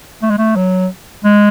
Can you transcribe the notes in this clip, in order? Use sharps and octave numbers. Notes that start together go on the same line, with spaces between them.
A3
G#3
A3
F#3
G#3